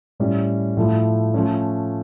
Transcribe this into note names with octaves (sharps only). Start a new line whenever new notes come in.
A2 G3 C#4
A2 F3 A3
F3 A3 C#4